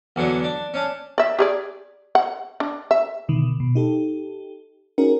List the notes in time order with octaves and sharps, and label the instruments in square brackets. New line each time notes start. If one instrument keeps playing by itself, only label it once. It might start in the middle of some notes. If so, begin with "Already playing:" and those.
[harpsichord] E2 D3 F#3 D4
D4
C#4 D4
[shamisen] D5 E5
G4 G#4 D5
F#5
D4
E5
[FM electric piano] B2 D3 D#3
B2
D#4 G4 A4
C#4 D#4 F#4 G#4 A#4